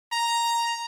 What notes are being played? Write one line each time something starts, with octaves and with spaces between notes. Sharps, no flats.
A#5